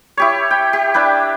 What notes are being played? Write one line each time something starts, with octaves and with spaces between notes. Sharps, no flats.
E4 G4 C#5
G5
G4
D4 E4 B4 G5